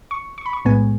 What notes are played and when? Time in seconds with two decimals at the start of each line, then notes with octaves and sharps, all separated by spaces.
0.11 C#6
0.38 C#6
0.46 B5
0.53 C#6
0.65 B1 A2 G#3 B3 G#5